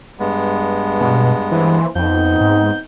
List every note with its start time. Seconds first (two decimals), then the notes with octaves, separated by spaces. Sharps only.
0.20 G2 G#3 B3
1.01 F#2 B2
1.52 E3 A#3 E4 C5
1.95 F2 B3 C4 D#4 G6
2.41 G#2